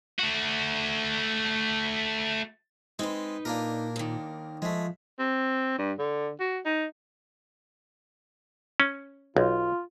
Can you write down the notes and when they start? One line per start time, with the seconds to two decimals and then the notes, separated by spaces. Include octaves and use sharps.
0.19 A3 F#4
2.99 G#3 C4 D#4 B4
3.45 A#2 A#3 D4 A#4
3.96 D#2 D#3
4.62 F3 G#3 A3
5.19 C4
5.78 G2
5.99 D3
6.40 F#4
6.65 D#4
8.80 C#4
9.37 B1 F4